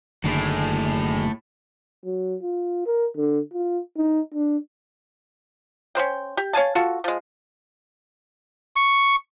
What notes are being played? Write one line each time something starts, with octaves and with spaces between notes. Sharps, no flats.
F#1 A2 D3 D#3 F#3 A#3 G#4
F#3
F4
A#4
D3
F4
D#4
D4
C#4 E4 C5 G5
G4
C#5 F5 G#5 A5
F4 F#4 A4
F3 G#3
C#6